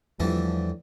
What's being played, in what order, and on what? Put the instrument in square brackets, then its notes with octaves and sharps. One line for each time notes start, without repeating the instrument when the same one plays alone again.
[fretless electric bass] E2 G3 [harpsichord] A2 D3 E3 [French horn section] F3